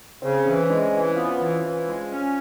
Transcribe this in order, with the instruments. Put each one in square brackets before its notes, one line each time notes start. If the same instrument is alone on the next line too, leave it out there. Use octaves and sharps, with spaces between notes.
[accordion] C#3 [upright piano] C4
[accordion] E3 [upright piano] C#4
[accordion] G#3 [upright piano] D4
[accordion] E3
[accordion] B3 [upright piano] F4
[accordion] E3
E3
G#3
C#4